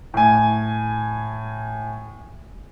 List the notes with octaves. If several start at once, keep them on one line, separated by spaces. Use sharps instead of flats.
A2 G#5